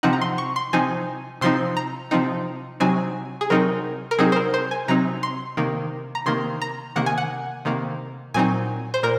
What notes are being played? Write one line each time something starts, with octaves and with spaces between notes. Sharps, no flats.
C3 F3 C4 D#4 F#5
A#5
C6
C#6
C6
C3 F3 C4 D#4 G#5
C3 F3 C4 D#4 C6
A#5
C3 F3 C4 D#4
C3 F#3 C4 D#4 G#5
G#4
C3 F#3 C4 D#4 A#4
A#4
C3 F#3 C4 D#4 G#4
C5
A#4
C5
G#5
C3 F#3 C4 D#4 A#5
C6
C3 D#3 A#3
A#5
C3 D#3 A#3 C6
A#5
C3 D#3 A#3 F#5
G#5
F#5
C3 D#3 A#3
A#2 F#3 C4 D#4 G#5
C5
A#2 A#4